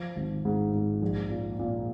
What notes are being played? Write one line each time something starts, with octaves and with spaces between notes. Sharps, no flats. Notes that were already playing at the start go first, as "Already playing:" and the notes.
Already playing: F3
G#1
G#2
G#2
A#1
A#2
A#2